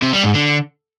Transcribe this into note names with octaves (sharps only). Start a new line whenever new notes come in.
C3
G3
G#2
D3